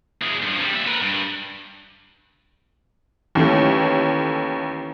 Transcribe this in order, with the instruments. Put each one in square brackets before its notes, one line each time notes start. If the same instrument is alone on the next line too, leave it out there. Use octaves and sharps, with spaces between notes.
[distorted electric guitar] E2 G#3
G2 F3
C3 G3
A#2 E5
A#4 B4
G2
[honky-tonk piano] D#2 A3 [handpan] E3 C#4